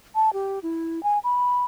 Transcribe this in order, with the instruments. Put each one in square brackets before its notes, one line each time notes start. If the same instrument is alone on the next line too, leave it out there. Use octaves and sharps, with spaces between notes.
[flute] A5
G4
E4
G#5
B5